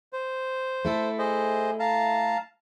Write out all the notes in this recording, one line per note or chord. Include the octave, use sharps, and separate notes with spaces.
C5
A3 E4 A4
G#4 C5 D#5
F5 A5 A#5